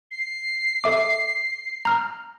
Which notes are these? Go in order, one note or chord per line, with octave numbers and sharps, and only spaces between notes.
C7
A4 E5 D6
A#5 F6